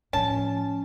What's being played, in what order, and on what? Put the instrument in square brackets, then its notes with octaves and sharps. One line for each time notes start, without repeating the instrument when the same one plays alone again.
[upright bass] A2 F3 [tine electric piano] C#4 [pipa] A5